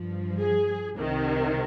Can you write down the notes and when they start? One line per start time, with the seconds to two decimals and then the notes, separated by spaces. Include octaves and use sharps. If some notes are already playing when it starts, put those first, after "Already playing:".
Already playing: G2 F3
0.39 G#4
0.93 C2 C3 D#3